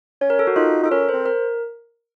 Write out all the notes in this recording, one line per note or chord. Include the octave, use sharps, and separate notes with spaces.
C#4 C#5
A#4
A4
F#4
D#4 F4
D#4 A4
C#4 A#4
C5
C4
A#4